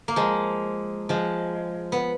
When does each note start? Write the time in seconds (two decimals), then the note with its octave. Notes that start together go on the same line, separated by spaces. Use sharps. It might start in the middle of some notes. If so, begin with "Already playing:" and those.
0.08 A#3
0.16 F3 G#3
1.09 F3 G#3
1.92 B3